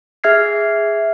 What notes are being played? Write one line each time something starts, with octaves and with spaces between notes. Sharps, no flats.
G#4 E5 F6 G#6 C7